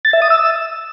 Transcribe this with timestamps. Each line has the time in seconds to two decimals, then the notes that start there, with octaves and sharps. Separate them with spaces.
0.05 A6
0.13 E5
0.22 D#6
0.30 E6